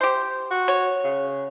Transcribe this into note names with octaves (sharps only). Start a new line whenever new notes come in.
G4 C5
F#4
C#5
C#3